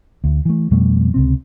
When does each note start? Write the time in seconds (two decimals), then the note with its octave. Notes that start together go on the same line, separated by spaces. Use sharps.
0.24 D2
0.45 E3 A3
0.71 F2 B2 G3 A3
1.14 C#2 C3 C4